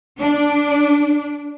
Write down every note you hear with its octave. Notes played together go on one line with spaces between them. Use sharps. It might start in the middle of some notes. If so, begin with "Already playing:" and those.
D4